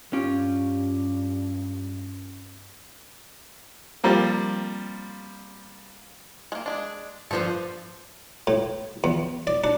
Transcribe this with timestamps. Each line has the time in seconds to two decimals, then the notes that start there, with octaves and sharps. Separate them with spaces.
0.13 G2 C#4 F4 G4
4.04 F3 G3 A#3 C4
6.52 G#3 A#3
6.66 G#3 D4
7.31 G2 F3 B3 A4 C5
8.47 A2
9.04 E2
9.47 D5
9.64 D4